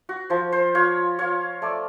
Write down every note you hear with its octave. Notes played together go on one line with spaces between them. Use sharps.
F#4
F3 C5
C5
F4 C#5
F4 C#5
A3 D5